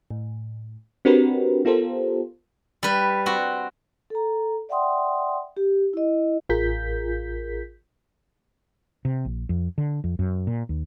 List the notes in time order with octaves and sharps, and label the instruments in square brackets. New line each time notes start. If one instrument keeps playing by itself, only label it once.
[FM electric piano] A2
C4 D4 F#4 G4 A#4 B4
B3 F4 G4 A4 A#4 C5
[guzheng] G3 B4
C4 F#4
[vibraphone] A4 A#5
D5 E5 F#5 G5 C6 D#6
G4
E4 D#5
[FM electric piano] A1 F4 G#4 A#4 G6 B6
[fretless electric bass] C3
A#1
F2
D3
F2
F#2
A#2
D#2